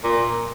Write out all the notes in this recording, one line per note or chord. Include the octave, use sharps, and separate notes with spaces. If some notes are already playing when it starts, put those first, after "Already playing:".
A#2